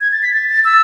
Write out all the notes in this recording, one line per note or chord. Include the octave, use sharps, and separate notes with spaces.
G#6
A6
B6
A6
A6
E6